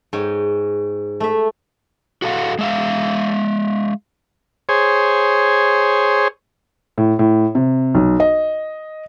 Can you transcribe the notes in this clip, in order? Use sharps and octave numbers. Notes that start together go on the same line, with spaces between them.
G#2 C#5 G5 G#5
A3 E5
F#4 A4 F5 F#5
G#3 E5 F5
G#4 C5 C#5
A2
A2
C3
B1
D#5